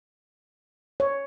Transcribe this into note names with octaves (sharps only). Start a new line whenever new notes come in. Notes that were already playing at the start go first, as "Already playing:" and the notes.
C#5